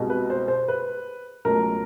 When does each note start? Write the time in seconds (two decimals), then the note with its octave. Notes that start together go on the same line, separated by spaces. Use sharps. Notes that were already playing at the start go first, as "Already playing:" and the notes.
Already playing: C2 B2 G#3
0.10 B4
0.30 C5
0.48 C5
0.68 B4
1.45 C#2 B2 F#3 A3 A#4